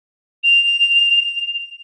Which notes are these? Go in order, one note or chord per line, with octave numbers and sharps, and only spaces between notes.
F7